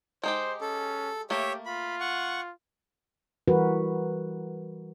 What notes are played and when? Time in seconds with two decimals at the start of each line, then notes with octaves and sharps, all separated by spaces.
0.23 G#3 D#4 G4 C5
0.61 C#4 A4
1.30 A3 A#3 G4 C#5 E5
1.66 F4 B5
2.00 F#5 C#6
3.48 E3 G3 F#4 A#4 B4